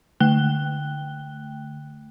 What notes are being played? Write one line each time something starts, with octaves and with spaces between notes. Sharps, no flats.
D3 A3 G5 F#6 G7